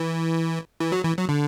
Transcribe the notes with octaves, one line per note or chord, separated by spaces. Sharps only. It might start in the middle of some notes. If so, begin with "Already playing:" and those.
Already playing: E3
E3
F#3
E3
F#3
D3